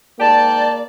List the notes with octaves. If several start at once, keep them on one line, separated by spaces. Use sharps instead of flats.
G#2 A#3 D5 G5 A5